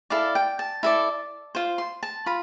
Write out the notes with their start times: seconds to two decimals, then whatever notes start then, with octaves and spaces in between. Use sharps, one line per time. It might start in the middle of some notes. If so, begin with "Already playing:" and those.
0.10 E4 A4 D5 F5
0.35 G5
0.59 A5
0.83 E4 A4 D5
1.55 F4 C5
1.78 C6
2.03 A5
2.26 F4 B5